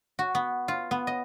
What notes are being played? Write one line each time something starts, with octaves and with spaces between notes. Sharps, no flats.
F#4
B3
F4
B3
D#5